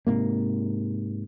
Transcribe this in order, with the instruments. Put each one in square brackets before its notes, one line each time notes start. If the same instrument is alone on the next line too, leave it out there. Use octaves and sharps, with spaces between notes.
[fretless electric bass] G#2 C3 A#3